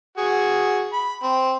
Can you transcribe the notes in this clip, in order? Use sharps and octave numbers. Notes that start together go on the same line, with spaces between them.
F#4 G#4
B5
C4